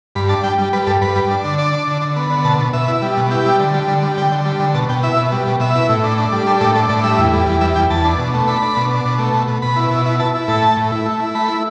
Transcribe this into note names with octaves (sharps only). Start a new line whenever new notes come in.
G2 B5
D4 A5
G3 G5
G3
G3 B4
G2 A4
G2 B4
G3
D4
D3
D4 D5
D4
D3
D3
B3
D3
B2 A5
B2
B2 E5
E4
G3
B2
E4 G4
G3
D3
G3
D3
G3
D3 G5
D3
G3
D3
B2 A5
B2 G5
E4 E5
B2
G3
B2
B2 E5
E4
A2
D4
D4
G3
D4 A4
A2 A4
D4 A4
A2 D5
G3 E5
E2
G3
E2
G3 E5
E2 G5
E2 A5
D4
B2
A3
D4 B5
D4
B2
D4
B2
A3
B2
B2
B2 B5
E4
B2
E4
E4 A5
E4
A2 A5
A3
A2
E4
A3
E4
A3 B5
E4